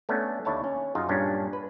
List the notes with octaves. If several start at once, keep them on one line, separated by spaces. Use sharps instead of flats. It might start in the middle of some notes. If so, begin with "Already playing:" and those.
A3 B3 C#4 D4
D#2 D4 E4 C#5 A5
C#4
F#2 D#4 F4 G#4
G2 A#2 A#3 C#4 D4
B4